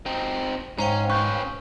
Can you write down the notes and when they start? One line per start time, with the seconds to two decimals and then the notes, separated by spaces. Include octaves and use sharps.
0.06 C4 D#4
0.78 G#2 C#4 C5 F5 G5 A#5
1.10 C#4 B4 C#6 G6